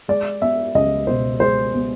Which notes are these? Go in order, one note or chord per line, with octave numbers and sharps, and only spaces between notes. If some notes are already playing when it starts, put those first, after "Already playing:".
G#3 D5
B3 E5
C#2 D#5
B2 C5
G#3 C5
B3